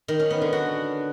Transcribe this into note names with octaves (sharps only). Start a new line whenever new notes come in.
D#3
C#4
B3
D3
F#4